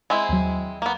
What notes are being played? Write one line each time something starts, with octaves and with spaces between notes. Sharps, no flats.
G#3 C4 E4
D#2 F#3
A#3 B3